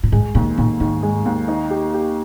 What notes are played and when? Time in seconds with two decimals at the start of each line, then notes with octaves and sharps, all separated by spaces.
0.03 A#2
0.12 G#2 G#3
0.35 D#2 A#2
0.58 D#2 A#2
0.80 G#2 D#3
1.03 G#3
1.25 D#2
1.48 D#4
1.70 G4
1.94 G4